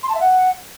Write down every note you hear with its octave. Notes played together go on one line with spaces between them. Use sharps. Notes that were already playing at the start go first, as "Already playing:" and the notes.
C6
A5
E5
F#5